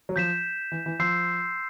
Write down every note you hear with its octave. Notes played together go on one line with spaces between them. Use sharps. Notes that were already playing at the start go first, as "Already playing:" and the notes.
F#3
F3 G6 B6 E7
E3
E3
F3 C6 E6 G6 C7